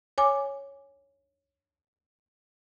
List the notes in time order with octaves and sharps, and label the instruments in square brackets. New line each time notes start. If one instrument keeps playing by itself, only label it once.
[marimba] C#5 G#5 D6